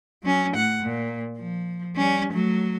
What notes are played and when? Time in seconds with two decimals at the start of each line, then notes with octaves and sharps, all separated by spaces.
0.23 F#3 C#4
0.54 A2 F#5
0.83 A#2
1.37 F3
1.96 G3 C#4
2.32 F#3 A3